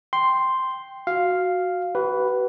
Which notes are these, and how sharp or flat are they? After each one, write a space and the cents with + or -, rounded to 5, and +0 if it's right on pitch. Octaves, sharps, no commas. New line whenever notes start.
G5 +0 C6 +0
F#4 -5 F5 +0
F#4 +45 B4 +0